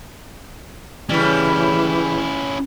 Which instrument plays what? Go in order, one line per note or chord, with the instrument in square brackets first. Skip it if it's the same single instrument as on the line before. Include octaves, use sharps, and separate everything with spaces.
[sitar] C#3 G3 [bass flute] E3 [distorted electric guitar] C#4 E4